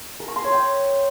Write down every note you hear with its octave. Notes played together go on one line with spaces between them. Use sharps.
A#4
C#6
C6
C#5
G5